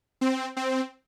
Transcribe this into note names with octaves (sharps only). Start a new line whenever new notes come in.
C4
C4